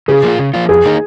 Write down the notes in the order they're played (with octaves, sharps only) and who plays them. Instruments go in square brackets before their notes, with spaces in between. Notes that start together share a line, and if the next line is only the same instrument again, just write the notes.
[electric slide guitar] C#3 [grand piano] G#4
[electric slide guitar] F3 A#3 F4
C#3
F3 A#3 F4
[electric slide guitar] F2 [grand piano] G#4
[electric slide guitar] D#3 A#3 D#4